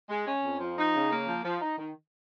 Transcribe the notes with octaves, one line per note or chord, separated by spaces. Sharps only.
G#3
C#4
F2
F3
D#4
C#3
A#3
F3
F3
D#4
D#3